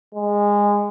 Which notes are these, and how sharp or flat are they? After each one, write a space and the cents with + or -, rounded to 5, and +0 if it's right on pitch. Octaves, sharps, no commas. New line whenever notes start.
G#3 -20